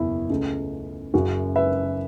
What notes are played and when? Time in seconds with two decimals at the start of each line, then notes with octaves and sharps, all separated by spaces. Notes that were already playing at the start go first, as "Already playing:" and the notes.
Already playing: F#1 E2 B2 E4
0.29 C#2 C#3 A3
1.14 F#1 F#2 C#3 F#4
1.56 B4 E5